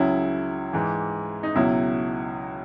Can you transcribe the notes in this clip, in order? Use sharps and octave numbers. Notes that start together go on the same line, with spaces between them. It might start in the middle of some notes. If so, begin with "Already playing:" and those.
Already playing: C#2 C#3 F#3 E4
G#2 E3
D#4
C#2 B2 F#3 E4